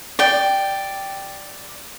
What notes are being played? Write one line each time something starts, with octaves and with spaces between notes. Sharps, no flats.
D5 G5